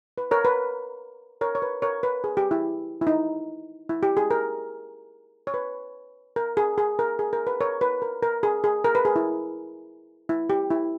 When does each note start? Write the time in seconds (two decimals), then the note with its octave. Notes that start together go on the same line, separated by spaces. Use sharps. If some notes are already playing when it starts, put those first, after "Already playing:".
0.18 B4
0.31 A#4 C#5
0.45 B4
1.41 A#4 C#5
1.55 C#5
1.62 B4
1.82 A#4 C#5
2.03 B4
2.24 G#4
2.37 G4
2.51 E4
3.02 E4
3.07 D#4
3.89 E4
4.03 G4
4.17 G#4
4.31 A#4
5.47 C#5
5.54 B4
6.36 A#4
6.57 G#4
6.78 G#4
6.99 A#4
7.19 G#4
7.33 A#4
7.47 B4
7.60 A#4 C#5
7.81 B4
8.02 A#4
8.23 A#4
8.43 G#4
8.64 G#4
8.84 A#4
8.95 B4
9.05 G#4
9.16 E4
10.29 E4
10.50 G4
10.70 E4